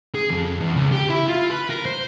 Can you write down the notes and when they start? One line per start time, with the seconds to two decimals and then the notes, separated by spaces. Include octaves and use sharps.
0.15 G#4
0.31 F2
0.61 E2
0.77 C#2
0.92 G4
1.10 E4
1.29 F4
1.51 B4
1.70 A#4
1.86 C5